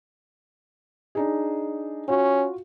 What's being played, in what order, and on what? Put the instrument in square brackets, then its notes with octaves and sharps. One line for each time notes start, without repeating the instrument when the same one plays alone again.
[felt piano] D4 D#4 G#4
[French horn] C#4 [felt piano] F4 F#4